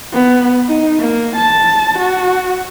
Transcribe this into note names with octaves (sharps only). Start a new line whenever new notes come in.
B3
D#4
A#3
A5
F#4